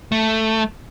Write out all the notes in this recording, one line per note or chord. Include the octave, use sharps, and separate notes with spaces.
A3